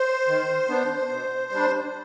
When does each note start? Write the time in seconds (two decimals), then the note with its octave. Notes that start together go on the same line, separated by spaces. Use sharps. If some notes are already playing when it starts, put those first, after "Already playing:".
Already playing: C5
0.28 D#3
0.69 B3 D4
1.10 B2
1.51 G3 D4